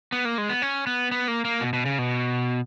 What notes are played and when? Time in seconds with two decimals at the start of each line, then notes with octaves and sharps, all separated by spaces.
0.12 B3
0.25 A#3
0.38 G#3
0.49 B3
0.62 C#4
0.87 B3
1.11 B3
1.28 A#3
1.45 A#3
1.61 B2
1.73 B2
1.86 C#3
1.99 B2